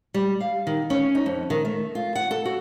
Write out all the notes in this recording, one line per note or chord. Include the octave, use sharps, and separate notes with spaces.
G3
F5
D#3
C#4
D#4
F2
D#3
A3
F4
F#5
A4
F#4